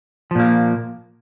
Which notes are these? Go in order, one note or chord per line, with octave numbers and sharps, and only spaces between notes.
A#2 F3 A#3